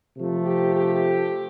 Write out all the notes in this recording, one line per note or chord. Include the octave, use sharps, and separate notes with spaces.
C3 F3 A3
G4
G4